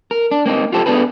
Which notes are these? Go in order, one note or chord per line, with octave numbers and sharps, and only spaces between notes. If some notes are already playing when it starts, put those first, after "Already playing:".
A#4
D4
A#3 C4 D#4
F4 G4 A4 C5
B3 D4 G#4 A4 B4